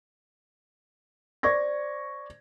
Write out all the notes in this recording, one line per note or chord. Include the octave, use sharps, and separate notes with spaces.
C5 D5 C#6 G#6 A#6